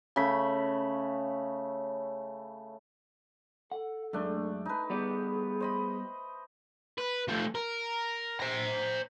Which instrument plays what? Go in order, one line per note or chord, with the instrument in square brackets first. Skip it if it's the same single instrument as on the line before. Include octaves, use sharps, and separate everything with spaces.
[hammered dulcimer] C#3 A3 B5
[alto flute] A4 [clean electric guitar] F#5
[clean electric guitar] F#2 G#3 [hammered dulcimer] A3 D4
[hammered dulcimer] D#4 B4 [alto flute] A5
[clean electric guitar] G3 B3 D5 [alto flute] G#4
[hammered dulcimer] C5 D#5 B5
[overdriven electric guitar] B4
F3 A3
A#4
C5 A#5